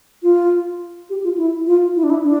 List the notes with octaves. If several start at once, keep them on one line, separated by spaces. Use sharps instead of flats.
F4
G4
F4
E4
F4
E4
D4
E4
D4